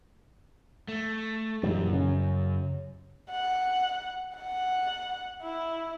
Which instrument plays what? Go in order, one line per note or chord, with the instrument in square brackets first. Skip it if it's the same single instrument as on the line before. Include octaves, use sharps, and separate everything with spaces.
[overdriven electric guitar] A3
[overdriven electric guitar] F#2 [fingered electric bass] A#2 E3 G3
[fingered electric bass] C#3 C#4
[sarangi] F#5
F#5
E4